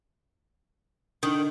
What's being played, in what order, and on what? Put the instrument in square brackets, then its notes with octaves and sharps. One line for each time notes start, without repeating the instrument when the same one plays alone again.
[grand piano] D3 [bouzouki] D#3